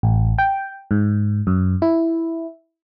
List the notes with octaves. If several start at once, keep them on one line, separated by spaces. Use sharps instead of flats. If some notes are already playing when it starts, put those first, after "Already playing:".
A1
G5
G#2
F#2
E4